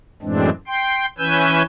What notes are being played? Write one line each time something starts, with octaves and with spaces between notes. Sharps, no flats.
F#2 A2 E3 G#3 C4 D4
G5 C6
E3 C#4 B4 G#5 E6 G6